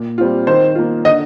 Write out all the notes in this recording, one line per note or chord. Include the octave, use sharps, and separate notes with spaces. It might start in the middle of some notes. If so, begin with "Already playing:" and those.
Already playing: A#2
G3 C4 F4
D#3 C5
A#3 F4
D3 D#5